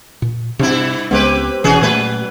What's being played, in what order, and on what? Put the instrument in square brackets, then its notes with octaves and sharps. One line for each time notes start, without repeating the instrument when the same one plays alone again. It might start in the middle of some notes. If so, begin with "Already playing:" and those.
[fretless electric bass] A#2
[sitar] G2 E4 [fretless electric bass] C3 C4
[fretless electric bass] C#2 G#3 B3 [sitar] C4 G4 B4
[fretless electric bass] E1 B2 E3 [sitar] C#4 F#4 G#4
[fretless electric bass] A#2 A3 [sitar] F#3 B4